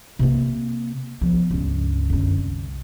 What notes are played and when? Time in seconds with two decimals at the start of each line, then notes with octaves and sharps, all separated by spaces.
0.19 C3 A#3
1.21 F3 B3
1.51 C#2 G2
2.10 F#2 D3
2.38 C2